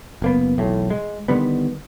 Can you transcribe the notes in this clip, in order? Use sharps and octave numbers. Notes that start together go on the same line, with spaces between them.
F#1 A#3 B3
E1 B1 A2
G#3
D3 D#3 G3 B3